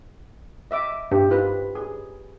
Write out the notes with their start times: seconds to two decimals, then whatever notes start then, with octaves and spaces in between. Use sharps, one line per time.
0.71 D#5 E5 D6
1.11 G2 G4
1.29 D#4 F4 B4
1.75 G#4